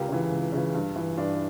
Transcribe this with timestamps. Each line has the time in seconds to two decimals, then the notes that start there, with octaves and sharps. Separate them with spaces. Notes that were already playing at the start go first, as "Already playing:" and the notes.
Already playing: C#2 G4 A#4
0.08 C#3 E3
0.30 C#2
0.52 C#3 E3
0.74 G2
0.96 E3
1.17 G2 D4